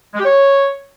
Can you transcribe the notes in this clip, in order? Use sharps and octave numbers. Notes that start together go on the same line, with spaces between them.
G#3
G4
C#5